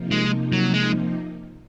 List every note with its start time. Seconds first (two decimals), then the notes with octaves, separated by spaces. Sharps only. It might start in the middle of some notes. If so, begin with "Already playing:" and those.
Already playing: C3 F3 A#3 D#4
0.11 G#3
0.52 F#3
0.74 G#3